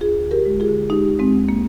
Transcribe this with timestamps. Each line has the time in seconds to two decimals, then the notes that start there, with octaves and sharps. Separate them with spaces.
0.01 D2 F4 G#4
0.24 D3
0.31 G4 A#4
0.45 G#3
0.60 F4 G#4
0.68 D3
0.90 G#3 D#4 G4
1.12 D2
1.19 G#3 C4
1.35 D2
1.49 A#3